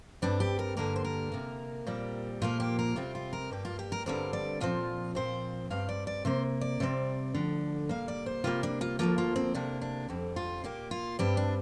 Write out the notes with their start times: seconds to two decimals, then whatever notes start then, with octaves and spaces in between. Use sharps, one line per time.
0.22 G2 G3 C4 D4
0.40 G4
0.59 A#4
0.77 G2 D3 G3 A#3 A#4
0.96 C5
1.04 A#4
1.32 C3 A#3
1.87 A#2 G3 C4
2.42 A#2 F3 A#3 F4
2.60 G4
2.79 A#4
2.96 C3 G3 C4 F4
3.15 F4
3.33 A#4
3.51 G2 G3 A#3 G4
3.65 F4
3.79 G4
3.92 A#4
4.06 G2 D3 G3 C4 A#4
4.33 D5
4.60 A#2 F3 C4 F4
5.15 A#2 F3 C4 C5
5.70 G2 G3 C4 F5
5.89 D5
6.07 D5
6.25 C3 A#3 C5
6.61 D5
6.80 C3 G3 C4
7.34 D2 D3 F3
7.89 A#2 G3 A#3 F5
8.08 D5
8.26 C5
8.44 C3 G3 A#3 F4
8.63 D4
8.81 F4
8.99 D2 D3 F3 A#3 F4
9.18 F4
9.36 C4
9.54 D2 C3 A#3 D4
9.81 D4
10.09 F2 D3 G3 C4
10.36 F4
10.64 A#2 A#3 G4
10.91 F4
11.19 G2 G3 C4 G4
11.37 D4